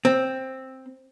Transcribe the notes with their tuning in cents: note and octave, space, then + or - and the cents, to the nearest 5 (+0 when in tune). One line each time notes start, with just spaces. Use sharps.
C4 +5